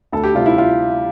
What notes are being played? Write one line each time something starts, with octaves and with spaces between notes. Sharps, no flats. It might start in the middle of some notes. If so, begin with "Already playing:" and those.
D2 A4
G4
C3 G3 F4
E4
F4